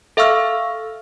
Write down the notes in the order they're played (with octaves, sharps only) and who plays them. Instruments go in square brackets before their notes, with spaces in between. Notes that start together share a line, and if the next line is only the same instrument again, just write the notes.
[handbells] A4 E5 F5 C#6 E6 F6